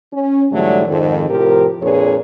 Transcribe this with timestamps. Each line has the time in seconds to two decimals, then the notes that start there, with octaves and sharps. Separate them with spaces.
0.13 C#4
0.52 G#2 D3 E3 F#3 G3 A3
0.87 F2 G#2 D#3
1.29 A2 C3 F3 G4 A#4
1.82 F2 A#2 D4 G#4 B4 C#5